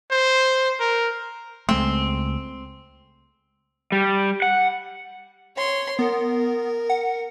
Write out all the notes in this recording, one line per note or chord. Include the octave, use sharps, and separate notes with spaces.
C5
A#4
C#2 G#3 A3 C4
G3
F#5
C#5 C6
B3 A#4
F#5